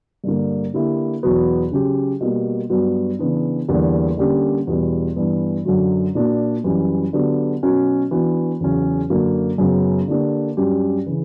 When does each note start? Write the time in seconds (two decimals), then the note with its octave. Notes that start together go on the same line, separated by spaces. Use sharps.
0.24 G2 D3 A#3
0.74 D3 A#3 E4 G4
1.23 E2 B2 F#3 B3 F#4
1.71 C#3 F#3 C#4 G4
2.21 B2 G3 A#3
2.70 G2 F#3 B3 F#4
3.19 C#3 E3 B3 D4
3.68 E2 D3 G3 A#3 D4
4.17 D3 G3 A#3 C#4 G4
4.67 E2 B2 G3 B3
5.16 G2 E3 B3
5.65 F#2 D3 F#3
6.15 A#2 A#3 D4 F#4
6.64 F#2 E3 G3 C#4
7.13 D3 F#3 B3 D4 G4
7.63 B2 F#3 C#4 F#4
8.11 E3 B3 D4 F#4
8.60 E2 C#3 F#3 C#4
9.10 F#2 D3 A#3 D4 F#4
9.58 F#2 C#3 F#3 B3
10.08 D3 A#3 D4 G4
10.57 G2 F#3 C#4 G4
11.06 C#3 E3